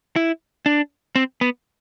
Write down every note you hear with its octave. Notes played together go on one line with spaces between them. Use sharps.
E4
D4
C4
B3